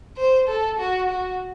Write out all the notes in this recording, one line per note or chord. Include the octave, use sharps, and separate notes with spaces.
C5
A4
F#4
F#4